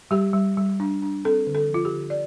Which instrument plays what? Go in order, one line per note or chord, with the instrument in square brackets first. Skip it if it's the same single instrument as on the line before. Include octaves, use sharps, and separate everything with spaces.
[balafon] G3 G4
G3
G3
D4
D4
C4 A4
D3
A4
F3
F4
G4
D3
D5